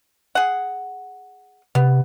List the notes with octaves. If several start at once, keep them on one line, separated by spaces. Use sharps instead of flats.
G#4 F#5
C3 B3